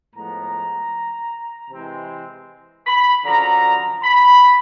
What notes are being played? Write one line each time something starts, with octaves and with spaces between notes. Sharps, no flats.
A2 F3 G#3 B3 A#5
C3 E3 G#3 C4
B5
F#2 D3 F3 A#5
B5